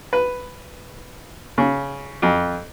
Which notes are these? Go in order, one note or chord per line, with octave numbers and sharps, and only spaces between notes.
B4
C#3
F2